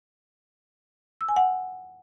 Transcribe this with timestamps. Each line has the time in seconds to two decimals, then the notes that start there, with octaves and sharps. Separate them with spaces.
1.21 E6
1.29 G#5
1.36 F#5